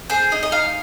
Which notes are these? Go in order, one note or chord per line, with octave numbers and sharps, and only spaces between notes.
G#4 C5
D#4 D#5
D#5
D#4 F5